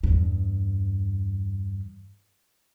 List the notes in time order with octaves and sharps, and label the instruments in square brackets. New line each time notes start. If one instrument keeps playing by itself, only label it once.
[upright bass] E2 G2